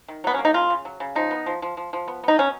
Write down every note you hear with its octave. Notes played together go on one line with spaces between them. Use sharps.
D#3
F#3 B3
C#4
A#3
D#4
C#3 F4
C#3
F#3
C#3
F3 D#4
B3
F3
F3
F3
F3
B3
B3 D#4
F#3 C#4